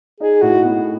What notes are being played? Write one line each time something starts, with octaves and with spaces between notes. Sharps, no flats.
D#4 G#4
A2 F#4
B3